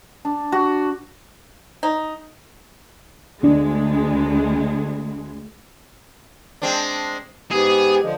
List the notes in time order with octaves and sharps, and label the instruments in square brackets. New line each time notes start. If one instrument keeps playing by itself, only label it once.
[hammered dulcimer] D4
F#4
[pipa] D#4
[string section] D2 G#3 [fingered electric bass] B3 D4
[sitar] G#3 C4 D4
[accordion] G#2 B3 [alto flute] G4 [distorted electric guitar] G#4
[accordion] D3 F3 [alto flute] D#5